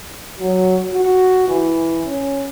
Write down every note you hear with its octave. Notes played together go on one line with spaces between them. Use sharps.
F#3
F#4
E3
C#4